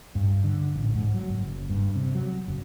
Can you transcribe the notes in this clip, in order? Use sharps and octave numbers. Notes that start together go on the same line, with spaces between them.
G2
D3
A1
G#2
F#3
F#1
G2
C3
F#3
F#1